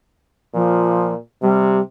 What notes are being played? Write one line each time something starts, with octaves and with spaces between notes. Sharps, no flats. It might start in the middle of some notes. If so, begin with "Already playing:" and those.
A#2 F3
C3 G3